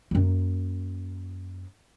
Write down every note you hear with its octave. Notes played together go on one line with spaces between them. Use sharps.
F#2 A#3